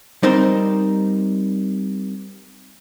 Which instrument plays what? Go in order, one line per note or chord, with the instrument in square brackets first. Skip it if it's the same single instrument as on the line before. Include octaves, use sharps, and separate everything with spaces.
[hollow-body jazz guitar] G3 C4 D#4 A#4 C5